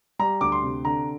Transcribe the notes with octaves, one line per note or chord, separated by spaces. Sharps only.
G3 A#5
D2 D6
C6
C3
D3 A#5